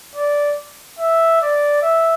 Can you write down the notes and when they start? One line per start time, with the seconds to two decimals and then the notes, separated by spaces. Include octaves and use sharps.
0.15 D5
0.99 E5
1.42 D5
1.82 E5